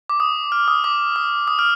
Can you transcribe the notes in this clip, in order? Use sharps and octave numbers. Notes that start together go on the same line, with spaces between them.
D6
D#6
F6
D#6
D6
D#6
D#6
F6